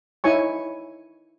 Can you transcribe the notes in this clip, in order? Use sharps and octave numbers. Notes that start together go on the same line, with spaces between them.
D#4 E4 C#5 G#5 C#6